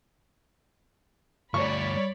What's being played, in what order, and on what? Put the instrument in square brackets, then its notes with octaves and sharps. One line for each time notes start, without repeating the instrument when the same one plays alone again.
[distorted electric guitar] D2 G2 [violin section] C#5 D5 B5 [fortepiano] C#6